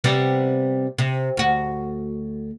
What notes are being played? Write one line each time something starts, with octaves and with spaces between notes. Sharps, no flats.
C3 G3 B3
C3
D2 F#4